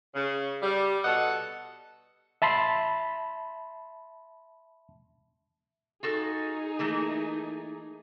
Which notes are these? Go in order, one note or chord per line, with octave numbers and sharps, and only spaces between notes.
C#3
G3
B2 A4 D#5 F#5
E5 A5 B5 C6
D#4 F4 F#4 G#4 A4
E3 A3 A#3